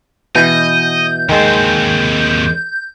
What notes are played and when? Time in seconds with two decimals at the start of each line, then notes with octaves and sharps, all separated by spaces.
0.35 B2 E3 D#5 G6
1.29 D#2 D#3 G#3 C4